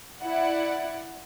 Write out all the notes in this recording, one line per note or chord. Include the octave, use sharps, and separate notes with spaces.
E4 D5 F#5